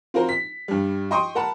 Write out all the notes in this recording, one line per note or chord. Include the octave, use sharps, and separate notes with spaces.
C4 F4 F#4 A#4 C5
B6
G2 G3
D#5 G5 C6 C#6 D#6
A#4 F#5 A5 B5